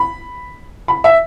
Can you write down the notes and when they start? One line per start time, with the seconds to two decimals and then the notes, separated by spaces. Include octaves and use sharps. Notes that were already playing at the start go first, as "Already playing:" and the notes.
Already playing: B5
0.88 B5
1.04 E5